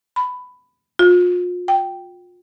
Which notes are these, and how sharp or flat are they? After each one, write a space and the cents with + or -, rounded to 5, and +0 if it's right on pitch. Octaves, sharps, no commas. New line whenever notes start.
B5 +15
F4 +35
G5 -5